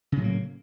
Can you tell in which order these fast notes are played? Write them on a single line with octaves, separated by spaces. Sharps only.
C#3 A2 F#3 A#3